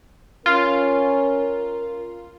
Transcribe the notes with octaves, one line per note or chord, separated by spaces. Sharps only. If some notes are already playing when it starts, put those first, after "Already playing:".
C#4 F4 A#4